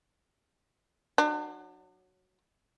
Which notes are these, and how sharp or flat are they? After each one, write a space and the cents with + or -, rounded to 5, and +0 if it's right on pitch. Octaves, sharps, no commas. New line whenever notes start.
F#3 +0 D4 +45